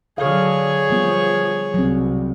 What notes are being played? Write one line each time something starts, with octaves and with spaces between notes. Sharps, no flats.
D3 F#3 G#4 C#5 F5
D3 F3 G3 B3
C2 F#3 C4